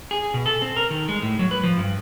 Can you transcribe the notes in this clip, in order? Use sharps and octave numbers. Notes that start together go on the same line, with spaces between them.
G#4
B2
A4
C4
A#4
D#3
G#3
A2
F#3
B4
F3
G2